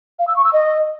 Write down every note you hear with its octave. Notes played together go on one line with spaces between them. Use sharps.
F5
E6
C#6
E6
D#5